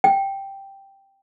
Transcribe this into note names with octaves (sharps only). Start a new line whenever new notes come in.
G5